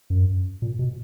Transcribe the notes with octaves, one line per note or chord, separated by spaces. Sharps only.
F#2
A#2
B2